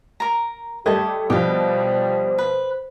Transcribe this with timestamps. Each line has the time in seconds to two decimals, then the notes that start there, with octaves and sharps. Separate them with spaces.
0.20 A#4 A#5
0.86 G3 A3 G4 D#5 A5 G#6
1.30 B2 F3 G3 G4 C5 F5
2.38 B4